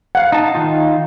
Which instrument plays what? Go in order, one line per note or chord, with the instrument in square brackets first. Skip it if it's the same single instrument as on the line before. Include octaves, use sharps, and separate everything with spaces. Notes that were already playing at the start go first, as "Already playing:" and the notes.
[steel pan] F5 F#5
[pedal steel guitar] D#4 A5
D#3 D#4 F4